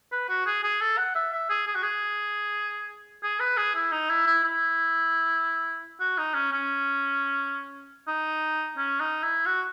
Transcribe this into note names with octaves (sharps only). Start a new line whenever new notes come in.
B4
F#4
G#4
G#4
A4
F#5
E5
E5
G#4
G#4
F#4
G#4
G#4
B4
G#4
E4
D#4
E4
E4
E4
F#4
D#4
C#4
C#4
D#4
C#4
D#4
E4
F#4